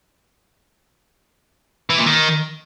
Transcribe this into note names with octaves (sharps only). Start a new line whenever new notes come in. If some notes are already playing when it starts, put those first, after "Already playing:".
E3
A#2
D#3